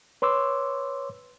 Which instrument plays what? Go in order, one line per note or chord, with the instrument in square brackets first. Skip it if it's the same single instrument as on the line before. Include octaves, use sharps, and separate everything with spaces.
[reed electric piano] B4 C#5 C6 D6 E6